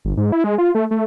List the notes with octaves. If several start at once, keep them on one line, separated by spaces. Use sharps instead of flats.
G1
G#2
E4
G#3
F4
A3
A3